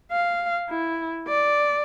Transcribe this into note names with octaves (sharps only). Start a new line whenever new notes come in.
F5
E4
D5